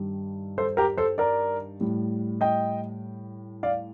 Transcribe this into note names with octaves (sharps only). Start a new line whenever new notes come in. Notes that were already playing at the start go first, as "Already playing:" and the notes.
Already playing: G2 D#3 G3
A4 C5
G4 A#4
A4 C5
A#4 D5
A2 G3
D#5 G5
D5 F5